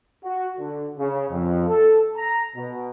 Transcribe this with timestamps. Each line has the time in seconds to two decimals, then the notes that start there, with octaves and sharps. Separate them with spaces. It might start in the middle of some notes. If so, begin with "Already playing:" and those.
0.24 F#4
0.58 D3
0.97 C#3
1.30 F2
1.68 A4
2.16 A#5
2.55 B2